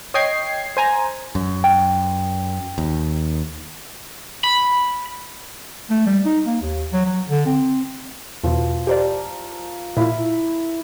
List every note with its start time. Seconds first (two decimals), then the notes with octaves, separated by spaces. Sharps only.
0.14 C#5 D#5 G5 G#6 C7
0.77 C5 G#5 A#5
1.35 F#2
1.64 G5
2.78 D#2
4.44 B5
5.90 A3
6.06 G3
6.26 D#4
6.46 A#3
6.62 D#2
6.93 F#3
7.06 F#3
7.29 D3
7.46 C4
8.44 E2 B2 F3
8.87 G4 A#4 C5 D5
9.97 A#2 E4 F4